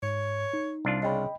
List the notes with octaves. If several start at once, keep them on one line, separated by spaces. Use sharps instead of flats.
G#2 C#5
D#4
C2 D4 F4
C#3 D#5 G5 B5